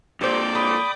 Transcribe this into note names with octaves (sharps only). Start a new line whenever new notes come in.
F2 A#2 G4 A4 C5 D5 G5
A4 B5 D6 D#6